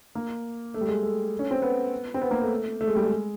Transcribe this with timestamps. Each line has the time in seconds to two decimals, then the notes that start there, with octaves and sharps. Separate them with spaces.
0.15 A#3
0.74 A3
0.81 G3
0.88 G#3
1.03 A3
1.39 C#4
1.51 C4
1.62 B3
2.14 C4
2.21 B3
2.31 A#3
2.42 A3
2.81 A3
2.88 G#3
2.96 G3
3.04 G#3